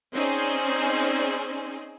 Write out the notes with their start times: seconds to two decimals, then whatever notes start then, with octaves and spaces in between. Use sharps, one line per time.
0.13 C4 C#4 D#4 G#4 C5 D5